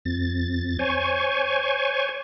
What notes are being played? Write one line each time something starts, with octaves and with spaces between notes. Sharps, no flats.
F2 A6
C5 C#5 G#5 C#6